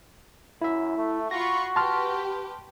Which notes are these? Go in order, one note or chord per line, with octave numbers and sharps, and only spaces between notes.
F#2 E4 E5
A3
F4 F#4 B5 C#6 A#6
G4 B4 A5 C6 F6